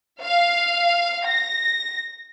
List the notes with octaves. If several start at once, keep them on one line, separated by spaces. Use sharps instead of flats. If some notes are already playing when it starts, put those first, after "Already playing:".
F5
A#6